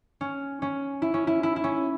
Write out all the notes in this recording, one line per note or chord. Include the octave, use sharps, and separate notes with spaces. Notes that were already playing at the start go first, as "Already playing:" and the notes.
C#4
C#4
E4
C#4
E4
E4
E4
C#4